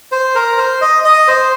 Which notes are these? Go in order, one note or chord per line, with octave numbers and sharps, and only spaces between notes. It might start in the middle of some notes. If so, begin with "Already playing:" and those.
C5
A#4
C5
D#5
D#5
C5